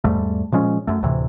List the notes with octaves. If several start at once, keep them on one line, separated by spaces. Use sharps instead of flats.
E2 G#2 G3 A3
A#2 F3 G#3 C#4
F#2 A3
D2 A2 C3 E3